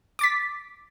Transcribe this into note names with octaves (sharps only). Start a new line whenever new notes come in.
D6 A6 B6